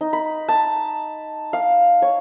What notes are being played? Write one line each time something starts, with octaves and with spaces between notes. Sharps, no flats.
D#4
B5
A5
F5
C#5